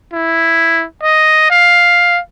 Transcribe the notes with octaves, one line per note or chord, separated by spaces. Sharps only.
E4
D#5
F5